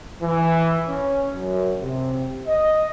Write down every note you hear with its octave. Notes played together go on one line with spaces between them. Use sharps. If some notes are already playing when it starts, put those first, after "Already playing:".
E3
C#4
F#2
C3
D#5